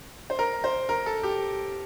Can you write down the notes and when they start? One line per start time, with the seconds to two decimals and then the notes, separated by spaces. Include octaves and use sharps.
0.30 C5
0.39 A#4
0.64 C5
0.89 A#4
1.06 A4
1.23 G4